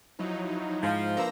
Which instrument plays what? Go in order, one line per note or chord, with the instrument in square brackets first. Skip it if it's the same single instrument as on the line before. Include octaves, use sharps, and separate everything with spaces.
[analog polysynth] F3 F#3 D#4 [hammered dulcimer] E4
[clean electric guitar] G#2 [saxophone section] F3
[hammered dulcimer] A#3 D4 B4 [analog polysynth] C5 A#5 E6